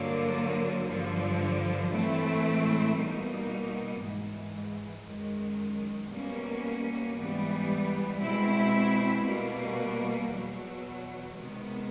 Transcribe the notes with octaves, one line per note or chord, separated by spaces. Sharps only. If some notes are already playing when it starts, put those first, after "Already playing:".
Already playing: G2 D3 F#3 A#3
G2 D3 F3
A2 E3 A3 C4 E4
B2 G3 A#3 D#4
G#2 E3 G#3
F#2 D#3 G#3
B2 G3 A#3 C#4
G#2 E3 G3 B3
B2 G#3 C4 E4
B2 G3 A#3
E2 B2 F#3
C3 D#3 G#3 B3